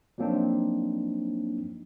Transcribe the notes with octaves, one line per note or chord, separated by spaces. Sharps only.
F3 F#3 A#3 C4 D4 D#4